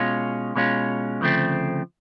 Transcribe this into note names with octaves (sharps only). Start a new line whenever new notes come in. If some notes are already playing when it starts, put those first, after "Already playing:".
Already playing: B2 G#3 C#4 F4
B2 G#3 C#4 F4
D2 C#3 F3 A3 C4